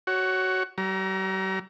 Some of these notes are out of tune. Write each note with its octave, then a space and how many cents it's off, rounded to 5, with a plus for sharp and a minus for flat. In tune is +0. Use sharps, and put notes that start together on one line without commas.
F#4 +15 C#5 +0
G3 -45 A#5 +20